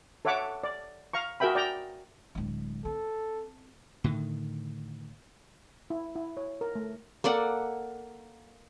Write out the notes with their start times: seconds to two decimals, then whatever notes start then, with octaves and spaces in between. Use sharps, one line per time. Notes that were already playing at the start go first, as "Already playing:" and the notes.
0.25 A4 C#5 E5 F#5 D6
0.64 D5
1.13 F5 A#5 C#6
1.40 F#4 G#4 A#4 E5 G5 B5
1.55 D5 G5 A#5
2.35 D1 G#3
2.85 C4 A4
4.04 A2 D3 D#3
5.90 E4
6.15 E4
6.37 C#5
6.61 A#4
6.75 A3
7.24 A#3 A4 D5 F#5